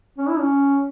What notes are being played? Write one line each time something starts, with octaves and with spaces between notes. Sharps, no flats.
C#4
E4
C#4